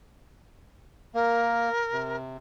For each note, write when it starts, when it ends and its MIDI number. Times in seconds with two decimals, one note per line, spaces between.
1.15 1.69 58
1.15 2.16 70
1.92 2.37 48